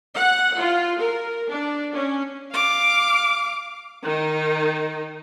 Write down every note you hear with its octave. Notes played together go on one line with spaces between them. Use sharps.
F#5
F4
A#4
D4
C#4
F5 D6
D#3 D#4